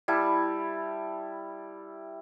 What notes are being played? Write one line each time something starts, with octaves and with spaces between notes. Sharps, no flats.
G3 E4 A5